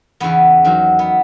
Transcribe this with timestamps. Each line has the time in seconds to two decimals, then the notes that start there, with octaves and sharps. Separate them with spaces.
0.20 E2 C#3 E3 B3
0.65 E2 D#3 F#3
0.99 B3